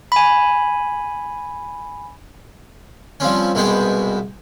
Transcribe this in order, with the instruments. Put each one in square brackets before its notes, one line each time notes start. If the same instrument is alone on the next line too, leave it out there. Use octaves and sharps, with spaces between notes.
[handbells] G#5 B5
[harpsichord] F3 G3 C4 C#4
C2 B2 G#3 B3 G5